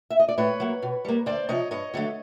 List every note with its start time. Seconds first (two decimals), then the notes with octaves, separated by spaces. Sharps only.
0.10 E5
0.20 D#5
0.29 D5
0.38 A2 B4 C#5
0.60 F#3 A#3
0.82 B2
1.05 G3 A#3
1.26 D2 C5 D5
1.49 C3 F3 C#5 D#5
1.71 G2 C#5 D#5
1.94 D3 F#3 A3